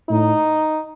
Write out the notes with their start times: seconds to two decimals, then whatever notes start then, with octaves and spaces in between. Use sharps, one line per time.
0.09 A2 D#4